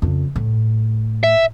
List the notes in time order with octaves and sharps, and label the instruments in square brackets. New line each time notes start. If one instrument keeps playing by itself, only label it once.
[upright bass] F2 C#3
A2
[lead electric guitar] E5